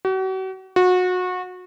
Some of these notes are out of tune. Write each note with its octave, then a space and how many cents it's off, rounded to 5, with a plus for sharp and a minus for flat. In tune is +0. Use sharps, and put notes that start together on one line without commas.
F#4 +40
F#4 -25